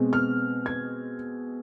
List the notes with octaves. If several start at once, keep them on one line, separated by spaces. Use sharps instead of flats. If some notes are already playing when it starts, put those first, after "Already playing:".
Already playing: B2 G#3 C4
F6
G#6